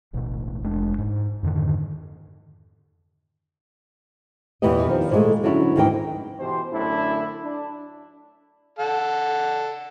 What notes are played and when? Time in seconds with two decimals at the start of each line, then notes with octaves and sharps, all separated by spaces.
0.13 D1 A1 B2
0.63 F1 G#3 D4
0.98 G#2
1.43 F2 G#2 D3 D#3
4.62 E2 A#2 E3 B3 G4 D#5
4.87 D#3 F3
5.12 A#2 G#3 A3
5.43 D3 F#3 C#4 D4 E4 F#4
5.76 D2 G#2 D#3 E3 D#4 G5
6.40 B2 E3 G4 C5
6.73 F#2 A2 D3 D4 E4
7.43 D4
8.79 A4 F#5